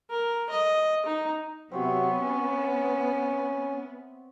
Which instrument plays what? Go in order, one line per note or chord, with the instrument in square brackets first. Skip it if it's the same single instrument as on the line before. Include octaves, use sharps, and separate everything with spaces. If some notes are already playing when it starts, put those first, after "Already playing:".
[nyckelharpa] A#4
D#5
D#4
[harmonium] C3 F#3 [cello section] B3 [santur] C4 C#5 E5
[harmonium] C#4